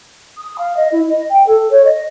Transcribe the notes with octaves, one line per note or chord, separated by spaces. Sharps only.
D#6
F5
D#5
E4
D#5
G5
A4
C#5
D#5